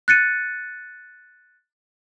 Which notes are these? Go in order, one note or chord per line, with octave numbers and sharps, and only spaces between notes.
F#6 A6 C#7 D#7